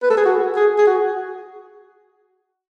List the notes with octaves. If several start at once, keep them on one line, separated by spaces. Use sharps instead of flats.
B4
A4
G#4
F#4
G#4
G#4
F#4